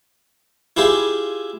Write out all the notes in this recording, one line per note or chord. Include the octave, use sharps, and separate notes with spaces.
E4 F4 G4 G#4